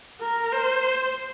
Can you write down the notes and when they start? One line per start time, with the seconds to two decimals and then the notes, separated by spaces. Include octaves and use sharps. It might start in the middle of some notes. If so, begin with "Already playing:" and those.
0.20 A#4
0.52 C5